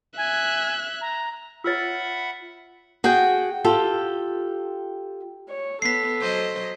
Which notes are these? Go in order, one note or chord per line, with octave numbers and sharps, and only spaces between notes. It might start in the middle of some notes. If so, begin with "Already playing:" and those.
E5 G#5 F#6
A#5
F4 C#5 E5 F#5 B5 E6 F6 A6
F#4 G#4 F#5 G5
F4 G4 A4 G5
C#5
B3 A4 B6 C7
F#3 C5 D#5